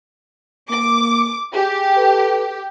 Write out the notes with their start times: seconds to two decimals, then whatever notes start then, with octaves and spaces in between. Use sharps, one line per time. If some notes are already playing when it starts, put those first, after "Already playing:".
0.70 A#3 D6
1.53 G4 G#4
1.97 A4 B4